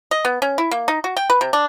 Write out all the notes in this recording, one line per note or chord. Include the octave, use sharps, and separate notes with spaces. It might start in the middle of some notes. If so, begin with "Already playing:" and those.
D#5
B3
C#4
E4
A#3
D#4
F#4
G5
B4
C3
D4